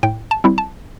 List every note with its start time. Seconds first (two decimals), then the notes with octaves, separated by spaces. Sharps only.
0.03 A2 G5
0.31 A5
0.44 G3 C4 E4
0.58 A5